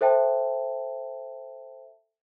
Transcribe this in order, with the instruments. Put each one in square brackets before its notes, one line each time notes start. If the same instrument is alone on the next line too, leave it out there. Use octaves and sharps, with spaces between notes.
[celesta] A4 C5 E5 G5 A5